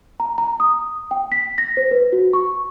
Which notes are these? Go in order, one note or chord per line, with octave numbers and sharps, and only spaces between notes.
A#5
A#5
D#6
G5
B6
A#6
C5
B4
F#4
C#6